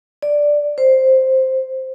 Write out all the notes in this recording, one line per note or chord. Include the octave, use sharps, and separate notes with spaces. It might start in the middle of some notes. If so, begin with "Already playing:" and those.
D5
C5